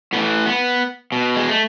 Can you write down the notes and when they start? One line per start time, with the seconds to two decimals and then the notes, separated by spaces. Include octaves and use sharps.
0.13 A2 B3
0.16 E3
0.46 B3
1.12 B2
1.36 G#3
1.49 A3